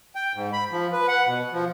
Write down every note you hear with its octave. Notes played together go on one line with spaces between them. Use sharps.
G5
G#2
B5
F3
B4
F#5
B2
F3